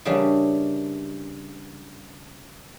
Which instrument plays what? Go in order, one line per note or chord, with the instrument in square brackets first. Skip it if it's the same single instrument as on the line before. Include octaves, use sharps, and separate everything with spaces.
[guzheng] C#3 E3 G3 A#3 C#4 D4